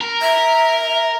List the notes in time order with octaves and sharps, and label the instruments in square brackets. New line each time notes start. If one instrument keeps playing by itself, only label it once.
[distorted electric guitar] A#4
[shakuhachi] E5